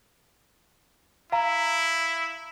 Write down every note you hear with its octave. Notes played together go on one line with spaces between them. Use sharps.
E4 F5 A#5